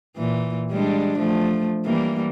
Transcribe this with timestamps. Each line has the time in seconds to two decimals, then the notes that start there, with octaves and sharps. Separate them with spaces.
0.17 A#2 E3
0.71 G3 G#3 D4
1.19 F3 A3
1.85 E3 G3 A#3